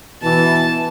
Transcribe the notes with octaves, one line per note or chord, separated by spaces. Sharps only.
B2 E3 A5